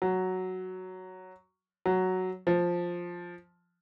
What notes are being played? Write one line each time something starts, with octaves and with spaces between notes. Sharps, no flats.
F#3
F#3
F3